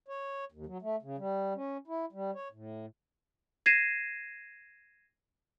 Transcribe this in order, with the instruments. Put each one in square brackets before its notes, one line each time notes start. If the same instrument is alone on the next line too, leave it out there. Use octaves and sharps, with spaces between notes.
[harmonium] C#5
D#2
F#3
A3
C#3
G3
C#4
E4
G3
C#5
A2
[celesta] G#6 A#6 C7 D#7 E7